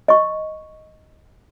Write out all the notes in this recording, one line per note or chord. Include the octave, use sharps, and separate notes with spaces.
D#5 C#6